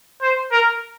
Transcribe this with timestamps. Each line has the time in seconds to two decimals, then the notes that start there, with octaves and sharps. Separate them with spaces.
0.22 C5
0.51 A#4